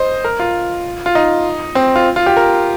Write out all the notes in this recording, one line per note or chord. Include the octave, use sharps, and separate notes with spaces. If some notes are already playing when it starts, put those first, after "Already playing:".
Already playing: C5 D#5
A#4
F4
F4
D#4
C4
F4
F4
G4
A#4